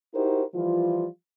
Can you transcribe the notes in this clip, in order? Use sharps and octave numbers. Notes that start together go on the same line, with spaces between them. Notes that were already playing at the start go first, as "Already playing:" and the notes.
D#4 E4 F#4 G4 A#4 C5
E3 F3 G3 F4